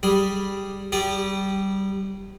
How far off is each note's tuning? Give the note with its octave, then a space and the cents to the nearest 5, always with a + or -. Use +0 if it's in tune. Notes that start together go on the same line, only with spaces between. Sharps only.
G3 +0 G#4 +0
G3 -15 G#4 -40